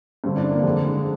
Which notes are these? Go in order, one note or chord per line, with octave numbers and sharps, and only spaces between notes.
G2 D3 C4
D4
A#3
F2 D3 G#3
G#3